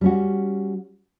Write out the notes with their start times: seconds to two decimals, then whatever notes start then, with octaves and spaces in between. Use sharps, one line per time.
0.01 G3 C#4 F#4